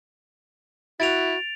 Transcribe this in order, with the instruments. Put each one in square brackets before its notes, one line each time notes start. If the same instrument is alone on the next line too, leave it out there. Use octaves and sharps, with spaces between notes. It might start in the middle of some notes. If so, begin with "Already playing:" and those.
[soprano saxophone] E4 [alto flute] F#4 [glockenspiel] A6 D7 F7